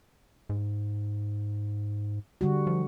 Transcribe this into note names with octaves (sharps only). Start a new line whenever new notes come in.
G#2
D3 G3 F#4
F3